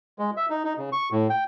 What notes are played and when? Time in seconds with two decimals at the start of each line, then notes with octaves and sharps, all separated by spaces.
0.19 G#3
0.37 E5
0.50 D#4
0.65 D#4
0.78 C#3
0.92 C#6
1.12 A2
1.30 G5